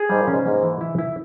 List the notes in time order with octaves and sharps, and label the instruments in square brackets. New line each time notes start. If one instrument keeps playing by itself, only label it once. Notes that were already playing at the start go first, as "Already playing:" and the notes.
Already playing: [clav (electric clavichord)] G#4
[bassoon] G#2 [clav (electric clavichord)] G3
[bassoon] A#2
[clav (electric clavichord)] C#4
[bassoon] G#2
[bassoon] G#2 [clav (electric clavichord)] A#3
[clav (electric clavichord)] E3
E4
E4